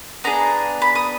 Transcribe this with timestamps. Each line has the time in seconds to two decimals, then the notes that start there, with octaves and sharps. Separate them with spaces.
0.24 B3 D4 G#4 A#5
0.82 B5
0.95 D#6